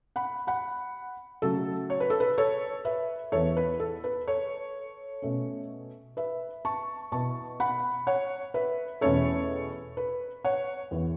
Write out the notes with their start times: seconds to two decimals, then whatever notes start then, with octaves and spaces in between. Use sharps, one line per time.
0.16 F#5 B5
0.47 F#5 B5
1.42 C#3 F#3 A3 A4
1.90 C#5
2.00 B4
2.10 A4
2.20 B4
2.38 A4 C#5
2.85 B4 E5
3.32 E2 E3 B3 A4 C#5
3.57 B4
3.80 A4
4.04 B4
4.27 A4 C#5
5.22 B2 A3 C#4
6.17 B4 E5
6.65 A5 C#6
7.12 B2 B3 E4 A5 C#6
7.60 F#5 B5
8.07 C#5 F#5
8.54 B4 E5
9.01 E2 B2 A3 C#4 E4 A4 C#5
9.97 B4
10.44 C#5 F#5
10.91 E2 E3 B3 E4